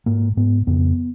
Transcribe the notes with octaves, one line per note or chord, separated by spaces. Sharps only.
G#2 A#3
G#2 B3
F2 C#3 B3